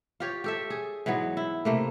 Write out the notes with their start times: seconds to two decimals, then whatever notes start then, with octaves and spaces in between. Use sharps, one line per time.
0.20 F4 G4 C#5
0.44 G4 A4 E5
0.70 G#4
1.06 G#2 E3 F#3 B3
1.37 E4
1.65 C3 A3 A#3